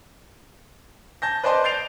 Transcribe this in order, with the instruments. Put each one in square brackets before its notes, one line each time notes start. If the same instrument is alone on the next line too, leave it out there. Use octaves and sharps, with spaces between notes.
[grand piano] A5 G6 A#6
B4 C5 D5 D#5 A5 C6
G6 A6 C7 D7 F7